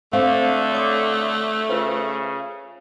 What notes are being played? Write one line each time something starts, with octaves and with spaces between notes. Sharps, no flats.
D3 A3 C4 F5
C#5 D6 D#6
C#3 F4 B4 C5